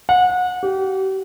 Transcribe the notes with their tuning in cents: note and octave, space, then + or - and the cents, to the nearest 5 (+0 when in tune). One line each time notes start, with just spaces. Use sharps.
F#5 -30
G4 -40